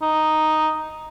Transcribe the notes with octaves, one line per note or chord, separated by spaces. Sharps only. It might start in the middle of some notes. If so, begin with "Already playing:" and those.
D#4